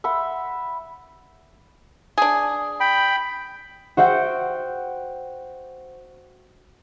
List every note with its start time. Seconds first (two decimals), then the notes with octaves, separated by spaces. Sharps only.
0.04 E5 F#5 B5 C6
2.18 D4 G#4
2.80 G5 B5
3.97 F#4 C5 E5 F#5 G5